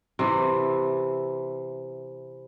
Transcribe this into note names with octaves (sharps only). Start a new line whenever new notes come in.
C3 E3